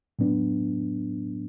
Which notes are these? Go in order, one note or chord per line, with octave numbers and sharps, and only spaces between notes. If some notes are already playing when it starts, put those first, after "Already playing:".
A2 F#3 B3 D4